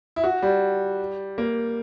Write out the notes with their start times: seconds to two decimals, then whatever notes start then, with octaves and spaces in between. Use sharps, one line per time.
0.16 E4
0.24 F#4
0.42 G3
1.38 A#3